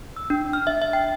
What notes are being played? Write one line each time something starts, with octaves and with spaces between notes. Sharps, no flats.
E6
D4
F6
E5
E5
G5